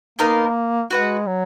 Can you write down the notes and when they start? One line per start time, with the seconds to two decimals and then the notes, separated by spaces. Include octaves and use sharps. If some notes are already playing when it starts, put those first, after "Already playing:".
0.19 A#3 B3 D#4 A#4 F5
0.91 G#3 F#4 B4 F#5
1.27 F#3